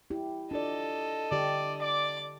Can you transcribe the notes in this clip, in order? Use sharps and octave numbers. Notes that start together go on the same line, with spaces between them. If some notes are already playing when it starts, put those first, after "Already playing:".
E4 G4
D4 F4 A4 D5 D#5
D3 G4 D5
D5 D6